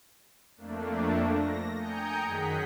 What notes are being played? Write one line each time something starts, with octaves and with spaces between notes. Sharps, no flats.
F2 A3 A#3 D4
A#6
G5 G#5 A#5 D#6 G6 C#7
F#2 D#3 G#4 F#5 B6